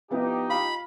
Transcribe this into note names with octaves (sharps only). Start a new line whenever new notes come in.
F3 B3 D#4 E4 G4
F4 F5 B5